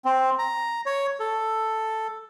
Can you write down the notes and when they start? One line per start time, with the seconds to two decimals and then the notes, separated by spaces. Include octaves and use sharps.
0.05 C4
0.39 A#5
0.86 C#5
1.20 A4